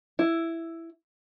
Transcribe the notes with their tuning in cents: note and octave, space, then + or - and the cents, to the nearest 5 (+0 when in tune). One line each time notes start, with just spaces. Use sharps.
E4 +5